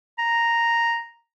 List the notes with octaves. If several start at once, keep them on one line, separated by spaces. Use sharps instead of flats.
A#5